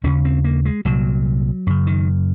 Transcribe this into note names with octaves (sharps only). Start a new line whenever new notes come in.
D#2 C#3 C#4
C4
A#3
G#3
C2 A#2 F#3
F#2 C#3
D#3